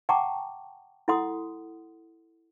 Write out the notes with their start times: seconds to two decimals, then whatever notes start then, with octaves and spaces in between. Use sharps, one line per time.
0.09 F#5 G5 A5 A#5 C#6 D6
1.08 E4 A4 F#5 C6 D#6